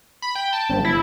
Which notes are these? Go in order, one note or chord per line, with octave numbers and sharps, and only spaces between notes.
B5
G5
A5
G1
E4